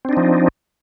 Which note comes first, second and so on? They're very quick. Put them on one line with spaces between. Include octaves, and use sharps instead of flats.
C4 D4 D#4 F3